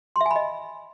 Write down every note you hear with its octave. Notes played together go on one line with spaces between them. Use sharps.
C6
E5
G#5
B5
D#5